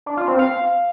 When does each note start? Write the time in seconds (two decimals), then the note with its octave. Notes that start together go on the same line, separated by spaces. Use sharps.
0.06 D4
0.17 F4
0.28 C4
0.39 F5